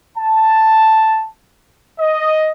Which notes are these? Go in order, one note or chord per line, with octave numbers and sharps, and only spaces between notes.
A5
D#5